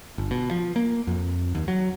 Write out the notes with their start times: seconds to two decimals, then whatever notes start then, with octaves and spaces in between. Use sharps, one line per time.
0.18 G1
0.31 B2
0.51 F3
0.76 A#3
1.07 F2
1.55 D#2
1.68 F#3